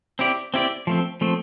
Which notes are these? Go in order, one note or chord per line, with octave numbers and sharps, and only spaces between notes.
C4 E4 G4 D5
C4 E4 G4 D5
F3 A3 C4
F3 A3 C4